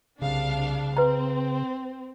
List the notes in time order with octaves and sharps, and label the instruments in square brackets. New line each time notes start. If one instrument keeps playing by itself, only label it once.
[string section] C2 D4 F5 [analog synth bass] C#3
[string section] C4 [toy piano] B4 A#5